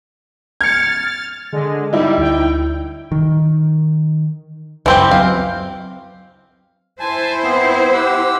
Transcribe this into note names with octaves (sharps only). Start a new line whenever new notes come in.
F6 G#6 A6 C#7
D3 G#3
G3 D#4 E4
D2 G5
D#3
C#2 F#2 E3 C4 G4
F#3 C4 F5
E4 C5 G#5 A5
B3 C4
G4 F#5 E6